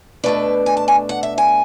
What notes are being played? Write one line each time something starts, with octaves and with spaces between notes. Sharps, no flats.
B2 A3 D4 B4
G#5
A5
G#5
F#5
E5
G#5